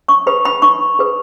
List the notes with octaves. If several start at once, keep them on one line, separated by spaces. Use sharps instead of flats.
C#6
G#4 B4 B5
B5
D#4 C#6
G#4 B4